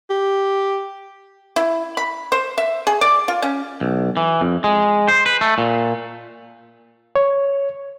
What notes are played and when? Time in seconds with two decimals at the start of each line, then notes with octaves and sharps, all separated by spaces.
0.10 G4
1.56 E4
1.97 B5
2.32 C5
2.58 E5
2.87 G#4
3.01 D5
3.28 F4
3.42 C#4
3.81 B1
4.17 E3
4.41 F2
4.64 G#3
5.08 C5
5.26 B4
5.41 A3
5.58 A#2
7.16 C#5